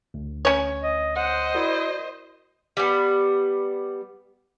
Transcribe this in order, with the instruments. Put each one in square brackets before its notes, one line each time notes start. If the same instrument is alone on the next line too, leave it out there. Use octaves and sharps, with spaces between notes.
[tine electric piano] D2
[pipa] C#4 C#5
[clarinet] D#5
[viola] C5 D#5 [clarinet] F#5
[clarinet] E4 [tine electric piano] F#4 A#4 D5
[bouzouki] G3 B3